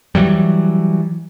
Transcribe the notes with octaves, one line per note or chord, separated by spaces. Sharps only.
E3 F#3 G3